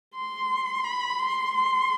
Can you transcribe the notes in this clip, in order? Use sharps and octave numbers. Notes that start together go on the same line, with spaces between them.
C6
B5
C6
C6